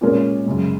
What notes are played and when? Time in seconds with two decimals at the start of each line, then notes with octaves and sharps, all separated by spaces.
0.01 A#2 G#3 C#4 A#4
0.46 F#2 C#3 G#3